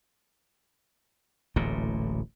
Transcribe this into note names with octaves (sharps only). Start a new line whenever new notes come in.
D1 A1 A#2 A3